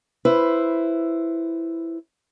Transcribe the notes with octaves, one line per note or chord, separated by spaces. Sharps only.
E4 B4 C5